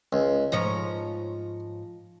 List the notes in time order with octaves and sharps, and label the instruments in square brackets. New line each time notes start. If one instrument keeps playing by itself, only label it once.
[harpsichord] C#2
[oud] G#2 F3 C#5 [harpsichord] A#5